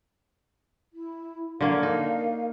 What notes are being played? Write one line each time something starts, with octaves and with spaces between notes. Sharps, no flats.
E4
D3 A#3 A#4 C#5 F5
D#4